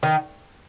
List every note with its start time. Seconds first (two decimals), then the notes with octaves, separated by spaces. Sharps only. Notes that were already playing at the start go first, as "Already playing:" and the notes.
0.03 D#3